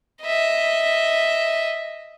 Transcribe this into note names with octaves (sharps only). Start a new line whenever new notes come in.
D#5 E5